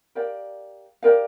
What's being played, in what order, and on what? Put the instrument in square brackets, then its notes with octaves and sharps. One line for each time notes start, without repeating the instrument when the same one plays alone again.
[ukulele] G4 A#4 D5 F5
G4 A#4 D5 F5